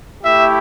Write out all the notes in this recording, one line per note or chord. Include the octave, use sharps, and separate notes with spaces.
A3 E4 G4 E5